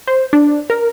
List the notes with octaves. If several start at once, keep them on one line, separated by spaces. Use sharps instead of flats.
C5
D4
A#4